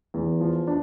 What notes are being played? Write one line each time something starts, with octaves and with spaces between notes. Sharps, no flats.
E2
F3
D4